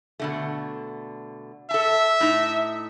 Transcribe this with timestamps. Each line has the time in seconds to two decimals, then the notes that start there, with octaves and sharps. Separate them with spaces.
0.19 B2 D3 A3
1.71 A4 E5 A5
2.20 A2 D#4